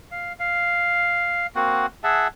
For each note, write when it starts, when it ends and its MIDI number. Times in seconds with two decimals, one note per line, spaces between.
0.11 0.33 77
0.39 1.47 77
1.55 1.86 58
1.55 1.86 60
1.55 1.86 66
1.55 1.86 78
2.04 2.27 68
2.04 2.27 76
2.04 2.27 78
2.04 2.27 81